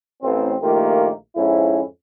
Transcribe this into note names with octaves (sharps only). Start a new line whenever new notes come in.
A1 C4
A#1 D#3 A3 A#3 F4 G4
F2 G#2 C#4 E4